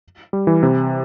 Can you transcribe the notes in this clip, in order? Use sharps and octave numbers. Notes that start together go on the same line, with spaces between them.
G3
E3
C3